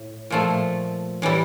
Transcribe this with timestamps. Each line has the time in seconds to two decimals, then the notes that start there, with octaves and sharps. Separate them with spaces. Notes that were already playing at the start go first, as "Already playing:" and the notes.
Already playing: A2
0.30 A#2 F3 A3
1.22 A2 E3 G3